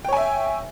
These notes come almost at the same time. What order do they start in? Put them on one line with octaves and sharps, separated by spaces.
G5 C#5 G#5 E5